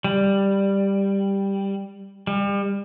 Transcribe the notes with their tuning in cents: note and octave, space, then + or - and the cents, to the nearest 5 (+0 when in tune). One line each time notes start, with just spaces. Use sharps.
G3 +5
G3 +35